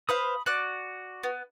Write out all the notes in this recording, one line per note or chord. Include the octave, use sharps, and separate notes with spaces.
B4 C5 F5 B5 D#6
F#4 D5 F#6
B3